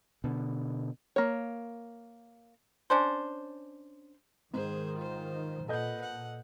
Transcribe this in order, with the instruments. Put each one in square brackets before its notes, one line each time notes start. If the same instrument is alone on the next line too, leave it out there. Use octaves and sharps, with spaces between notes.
[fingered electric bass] B2 D3
[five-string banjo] A#3 C#5
[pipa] C#4 D4 C5
[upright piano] G#2 [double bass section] D#3 [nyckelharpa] G#4 C5
[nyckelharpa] F4 C5
[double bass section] A#2 [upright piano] A4 D#5 G6 [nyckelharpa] B4 F#5
[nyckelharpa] F#5